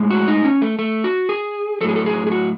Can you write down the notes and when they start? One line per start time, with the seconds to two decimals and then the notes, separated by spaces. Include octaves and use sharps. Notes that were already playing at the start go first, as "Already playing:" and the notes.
Already playing: A2 G#3
0.10 F#4
0.28 D#4
0.44 C#4
0.62 A3
0.79 A3
1.04 F#4
1.29 G#4
1.81 F#3 A4
1.84 A2 G#4
1.96 A4
2.06 G#4
2.27 G#4
2.32 F#4